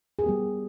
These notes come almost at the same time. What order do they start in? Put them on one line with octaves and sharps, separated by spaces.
G#4 A#4 G4 B3 G3